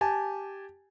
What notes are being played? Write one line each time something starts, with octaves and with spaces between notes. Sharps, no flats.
G4 G#5 A5